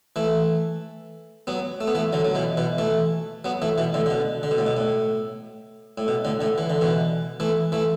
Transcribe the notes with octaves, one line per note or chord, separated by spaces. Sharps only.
E3 A3
F#3 B3
A3
B3
E3 A3
D3 F#3
F#3
B2 E3
B2 E3
E3 A3
F#3 B3
E3 A3
B2 E3
A2 D3
D3
B2
D3
B2
A2
B2
A2
A2
B2
A2 D3
A2 D3
E3
D3
B2 E3
E3 A3
E3 A3